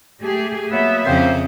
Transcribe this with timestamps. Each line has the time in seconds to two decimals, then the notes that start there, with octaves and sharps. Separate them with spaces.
0.20 A3 G4 G#4
0.71 F#3 A#3 B3 E5
1.06 F2 C#3 A#3 C4 C5